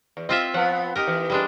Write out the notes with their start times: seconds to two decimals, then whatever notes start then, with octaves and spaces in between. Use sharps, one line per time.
0.17 E2
0.29 C4 F4 D#5 E5
0.54 F3 B3 F#5
0.96 D#4 G4 A#4
1.07 E3
1.30 G3 G#3 D4